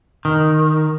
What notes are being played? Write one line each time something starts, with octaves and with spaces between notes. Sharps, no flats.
D#3